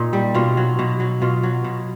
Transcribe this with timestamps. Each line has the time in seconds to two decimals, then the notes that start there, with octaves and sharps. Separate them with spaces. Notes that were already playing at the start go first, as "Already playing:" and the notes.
Already playing: A#2 D#4
0.13 G3
0.34 B2 F4
0.57 F#3
0.79 B2
1.00 F#3
1.22 B2 F4
1.43 F#3
1.64 B2